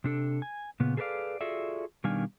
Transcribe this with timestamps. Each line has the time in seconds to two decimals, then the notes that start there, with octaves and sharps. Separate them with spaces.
0.04 C3 D4 A4
0.42 G#5
0.80 A#2 C#3 B3
0.97 G#4 A4 B4 C5 D5 F5
1.41 F4 F#4 G#4 A4 D5 E5
2.04 B2 D#3 G3 D4 F5 G#5